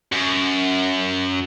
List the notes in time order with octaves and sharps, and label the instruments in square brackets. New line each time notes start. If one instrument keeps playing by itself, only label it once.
[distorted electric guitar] F#2